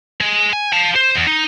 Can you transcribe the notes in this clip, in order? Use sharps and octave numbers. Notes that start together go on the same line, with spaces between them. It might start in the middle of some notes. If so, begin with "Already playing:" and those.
G#3
G#5
F5 A5
C5
E2
D#4